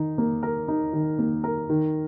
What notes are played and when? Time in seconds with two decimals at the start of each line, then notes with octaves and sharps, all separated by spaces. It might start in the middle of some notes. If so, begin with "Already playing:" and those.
Already playing: D#3 D#4
0.18 A#3
0.43 A#4
0.68 D#4
0.93 D#3
1.19 A#3
1.44 A#4
1.69 D#3